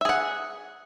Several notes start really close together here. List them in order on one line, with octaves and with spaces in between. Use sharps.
E5 G#4 F#5